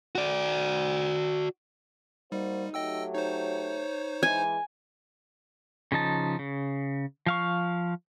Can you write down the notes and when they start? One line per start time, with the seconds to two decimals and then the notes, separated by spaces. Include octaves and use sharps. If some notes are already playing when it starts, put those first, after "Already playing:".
0.15 F#4 D5
2.32 G3 A#3 D#4 F#4 C5
2.74 F#3 A3 G4 D#5 G5 E6
3.15 D#4 C5 C#5
4.23 E3 G#3 G#5
5.92 C#3 F3 D#4 A5
6.39 C#3
7.26 F3 F5 C#6